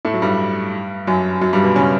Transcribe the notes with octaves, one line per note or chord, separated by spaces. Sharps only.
A2 A3
F#3
G2 G3
F#2 F#3
F#2 F#3
G2 G3
B2 B3
C#3 C#4